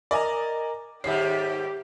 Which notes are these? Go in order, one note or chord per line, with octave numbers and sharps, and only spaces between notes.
A#4 D5 D#5 G#5 A#5
G#2 D#3 G3 G4 C#5 E5 C7